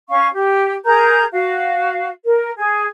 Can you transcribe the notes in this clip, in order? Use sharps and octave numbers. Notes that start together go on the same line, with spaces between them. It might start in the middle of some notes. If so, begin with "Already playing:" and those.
C#4 F5 C#6
G4
G#4 A#4 A#5 G6
F#4 F5
A#4
G#4